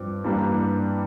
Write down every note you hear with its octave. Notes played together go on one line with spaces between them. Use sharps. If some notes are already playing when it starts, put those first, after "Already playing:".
Already playing: G2 F3 C4 D6
G2 E3 G3 A#3 D4